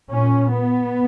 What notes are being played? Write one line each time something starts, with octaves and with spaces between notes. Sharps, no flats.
A#2 C#4
B3